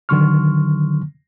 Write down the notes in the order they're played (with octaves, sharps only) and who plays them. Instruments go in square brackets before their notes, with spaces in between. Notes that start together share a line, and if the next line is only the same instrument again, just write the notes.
[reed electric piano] D3 D#3 F#3 C6 C#6 F6